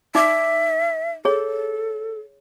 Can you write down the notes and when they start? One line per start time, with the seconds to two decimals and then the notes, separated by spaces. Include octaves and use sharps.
0.15 D#4 D5 E5 D6
1.25 G#4 A4 C#5